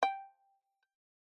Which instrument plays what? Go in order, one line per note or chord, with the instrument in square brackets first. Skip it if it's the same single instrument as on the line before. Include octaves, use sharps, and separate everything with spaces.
[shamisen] G5